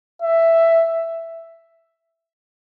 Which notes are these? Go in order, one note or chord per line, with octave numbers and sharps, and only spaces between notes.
E5